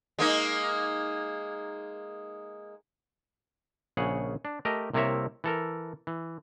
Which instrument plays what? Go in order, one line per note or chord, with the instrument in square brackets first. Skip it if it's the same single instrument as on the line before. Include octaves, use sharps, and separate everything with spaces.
[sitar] G#3 A#3 D#4
[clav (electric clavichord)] A#1 C#3 G#4 C#5 F#5
D4
A3 G4 A#4 D#5 G5 A5
C2 C3 A#3 A#4 C#5 E5
E3 A4 A#4
E3